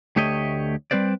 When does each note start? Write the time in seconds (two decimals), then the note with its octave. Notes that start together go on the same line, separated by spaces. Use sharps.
0.16 D2 A3 G4 C#5 D#5
0.91 G3 C4 B4 C5 D5